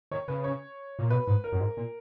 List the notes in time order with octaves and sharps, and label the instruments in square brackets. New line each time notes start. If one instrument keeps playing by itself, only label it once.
[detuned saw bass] D#3 [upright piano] C#5
[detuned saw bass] C#3 [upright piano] B4
[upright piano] C#5
[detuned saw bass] A#2
[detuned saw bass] B2 [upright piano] B4
[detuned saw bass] G#2
[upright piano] A#4
[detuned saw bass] F#2
G#2
A#2